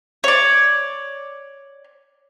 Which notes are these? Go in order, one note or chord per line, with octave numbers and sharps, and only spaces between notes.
C#5 D5